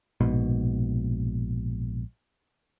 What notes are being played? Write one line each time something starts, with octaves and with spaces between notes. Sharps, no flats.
A#1 G#2 B2